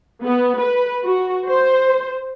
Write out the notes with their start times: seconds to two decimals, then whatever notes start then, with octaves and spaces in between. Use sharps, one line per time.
0.23 B3
0.59 B4
1.05 F#4
1.48 C5